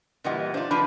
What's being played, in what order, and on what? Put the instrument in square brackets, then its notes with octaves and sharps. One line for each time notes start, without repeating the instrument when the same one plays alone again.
[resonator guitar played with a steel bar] A#2 E3 G3 [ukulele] F4 D#5 F#5
[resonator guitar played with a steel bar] D4 F4 [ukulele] D#4 C5
[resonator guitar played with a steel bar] F3 D4 B4 [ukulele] B5